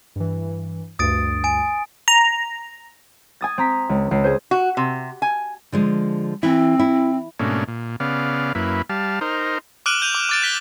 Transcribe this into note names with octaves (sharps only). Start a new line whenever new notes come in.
G2 E3
D2 G2 D#6 A6 D7
G#5 D7
A#5
G#5 D#6 A6
C4 A#5 B6
C#2
C#2 C7
G#4 C5
F#4
C3
G#5
D3 F3 G#3
E3 C4 E4
E4
G#2 B2 A3 A#3 C#4 D4
A#2
C#3 B3 D5 F5
F#2 A#3 E4 B4
G3 F5 A5
D#4 A#4 C5
D6 F6 F#6 D7 D#7 F#7
G6 D#7 F7
D6
D6 A6 D7
F#6 B6 G7